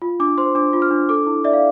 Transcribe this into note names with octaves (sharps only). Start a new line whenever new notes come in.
F4
D4 D6
C5 C6
D4 D6
F4
F6
D4
A4 D6
E4
D5 E5
F5